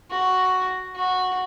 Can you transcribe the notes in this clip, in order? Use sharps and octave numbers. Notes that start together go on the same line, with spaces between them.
F#4
F#4